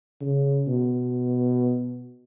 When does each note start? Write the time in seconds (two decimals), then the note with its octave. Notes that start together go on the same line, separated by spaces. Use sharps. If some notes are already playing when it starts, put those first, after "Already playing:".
0.21 C#3
0.67 B2